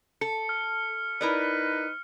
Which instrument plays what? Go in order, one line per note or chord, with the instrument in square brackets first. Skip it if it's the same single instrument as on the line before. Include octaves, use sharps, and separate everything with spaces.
[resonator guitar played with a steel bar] A4 [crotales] C#7
[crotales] F6
[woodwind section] D#4 B4 [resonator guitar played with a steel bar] E4 A#4 D5